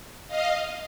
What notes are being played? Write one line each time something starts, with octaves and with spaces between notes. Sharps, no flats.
D#5 F5